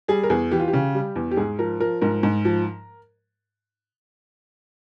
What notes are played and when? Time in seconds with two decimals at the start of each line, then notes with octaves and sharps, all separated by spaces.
0.08 G3 G#4
0.23 A#4
0.30 E2 G#4
0.51 E3 G4
0.60 F4
0.68 G4
0.73 C#3
0.94 G3
1.16 E2
1.31 G4
1.37 G#2 G#4
1.59 F3 A#4
1.80 F3 A#4
2.01 G#2 A#4
2.23 G#2
2.45 F3